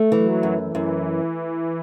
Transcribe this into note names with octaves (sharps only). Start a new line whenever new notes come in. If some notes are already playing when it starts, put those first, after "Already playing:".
Already playing: A3
E3 F#3
F#2
E3
F#2